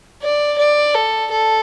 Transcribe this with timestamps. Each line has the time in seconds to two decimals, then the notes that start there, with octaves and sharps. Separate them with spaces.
0.22 D5
0.58 D5
0.95 A4
1.31 A4